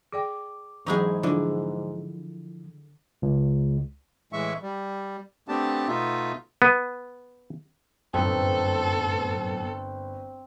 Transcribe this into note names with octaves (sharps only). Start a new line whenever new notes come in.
G#4 D5 G5 D6
G#2 E3 F#3 B3 D#4 E4 G#4
D3 F3 E4 F4 D5
C#2
A2 E3 G#3 E5 C#6
G3
A3 B3 C4 D4 G4 A5
B2 A3 B3 D#4 F4 E5
B3
G1 F#2 A2 B3 C4 A4